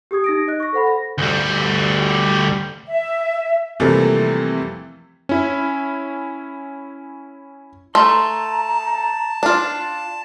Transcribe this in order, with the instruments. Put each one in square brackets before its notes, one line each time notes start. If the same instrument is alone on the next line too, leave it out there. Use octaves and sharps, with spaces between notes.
[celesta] G4 G#4 D#6 G#6
D#4 A#6 D7
D#5 F#6
C#6 A#6
A4 C5 F#5 B5
A#6
[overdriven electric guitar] D2 G3
[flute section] E5
[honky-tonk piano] C3 E3 F3 G3 A3 A#3
[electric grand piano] C#4 E4
[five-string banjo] A3 [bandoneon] A5 [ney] A#5 [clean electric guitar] C6
[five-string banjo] D4 F4